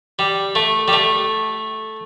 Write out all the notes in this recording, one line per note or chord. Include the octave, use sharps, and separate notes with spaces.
G3
A3
G3
A3